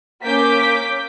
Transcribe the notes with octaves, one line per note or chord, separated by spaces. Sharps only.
A#3 C#4 D6 G6 B6